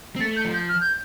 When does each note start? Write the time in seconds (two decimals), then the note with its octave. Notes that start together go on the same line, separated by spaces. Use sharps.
0.16 C4
0.20 A3 A6
0.36 G6
0.45 F3
0.54 G6
0.69 F6
0.81 G6